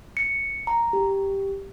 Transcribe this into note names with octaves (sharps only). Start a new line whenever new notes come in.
C#7
A#5
G4